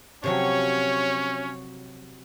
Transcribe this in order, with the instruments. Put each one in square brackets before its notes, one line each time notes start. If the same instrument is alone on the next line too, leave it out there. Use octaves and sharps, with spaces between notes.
[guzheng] C3 F3 F#3 [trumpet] C#4 [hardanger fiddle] C#5